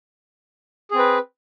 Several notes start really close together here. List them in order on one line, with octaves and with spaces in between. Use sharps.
G#4 C4 B4